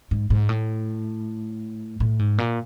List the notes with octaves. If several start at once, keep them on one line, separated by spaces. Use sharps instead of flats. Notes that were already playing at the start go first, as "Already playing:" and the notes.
G#2
G#2
A2
A2
G#2
A#2